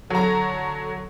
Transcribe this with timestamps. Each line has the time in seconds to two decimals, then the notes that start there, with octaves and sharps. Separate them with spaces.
0.10 D3 F#3 A4 A#5